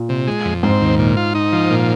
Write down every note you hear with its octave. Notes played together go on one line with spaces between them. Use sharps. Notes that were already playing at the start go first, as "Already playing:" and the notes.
Already playing: A#2
C3
G#3
F2
G#2 C4
D#2
A#2
F4
D#4
F3
A#2